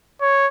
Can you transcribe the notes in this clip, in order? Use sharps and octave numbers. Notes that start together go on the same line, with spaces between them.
C#5